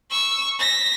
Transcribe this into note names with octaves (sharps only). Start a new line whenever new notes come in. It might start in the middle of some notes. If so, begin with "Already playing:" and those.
C#6 E6
A#6 B6